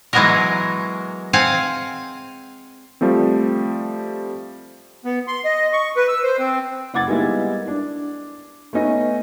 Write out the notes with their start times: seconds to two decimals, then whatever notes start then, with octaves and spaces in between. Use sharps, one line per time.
0.13 E3 F#3 G#3 B3 F#4 A#4
1.33 C4 F5 F#5 G#5
3.01 F3 G3 A3 C4
5.05 B3
5.28 C6
5.45 D#5
5.73 C#6
5.96 B4
6.09 E6
6.23 C5
6.39 C4
6.94 F#1 F#5 D6 G#6 A6
7.07 G3 G#3 A#3 B3 D#4 E4
7.68 D4
8.73 A3 B3 C#4 D#4 D#5